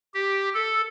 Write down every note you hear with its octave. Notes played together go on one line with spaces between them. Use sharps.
G4
A4